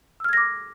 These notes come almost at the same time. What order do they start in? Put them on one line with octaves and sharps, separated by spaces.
E6 F6 G#6 A#6 D6